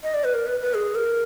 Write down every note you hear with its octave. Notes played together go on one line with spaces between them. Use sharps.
D#5
D5
B4
A#4
B4
B4
G#4
A#4